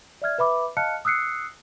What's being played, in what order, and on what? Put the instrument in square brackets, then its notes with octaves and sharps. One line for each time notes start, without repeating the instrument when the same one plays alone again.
[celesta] D5 E5 F6 G#6
B4 E5 B5 D6
D#5 F5 A5 F6 F#6 C#7
D#6 E6 F#6 C7 C#7